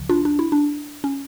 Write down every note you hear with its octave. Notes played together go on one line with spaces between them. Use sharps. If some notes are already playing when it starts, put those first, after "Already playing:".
Already playing: C#2 C#3 F3
D4 F4
D4
E4
D4
C#4